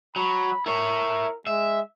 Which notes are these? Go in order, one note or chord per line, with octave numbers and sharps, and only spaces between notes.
F#3 B5
E4 A#4 C#5
G#3 E5